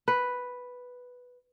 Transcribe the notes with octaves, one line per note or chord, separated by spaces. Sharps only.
B4